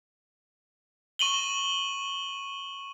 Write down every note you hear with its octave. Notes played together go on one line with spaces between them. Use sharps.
C#6 D#7 F#7 G7